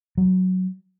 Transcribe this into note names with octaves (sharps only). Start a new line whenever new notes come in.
F#3